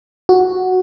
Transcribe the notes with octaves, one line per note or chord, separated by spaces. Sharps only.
F#4